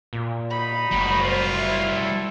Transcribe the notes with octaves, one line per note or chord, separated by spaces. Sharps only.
A#2
D#4 B5
F#1 G3 F#4
F4 C5
E4
A4